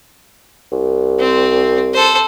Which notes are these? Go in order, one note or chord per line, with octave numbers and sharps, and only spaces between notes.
C2
C4
A4 C5